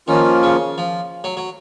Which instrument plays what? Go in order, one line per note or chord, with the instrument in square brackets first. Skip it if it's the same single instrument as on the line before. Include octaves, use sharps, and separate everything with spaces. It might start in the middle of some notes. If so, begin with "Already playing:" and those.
[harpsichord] D#3 [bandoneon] F3 A#3 C#4 F4
[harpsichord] C#3
F3
F#3
F#3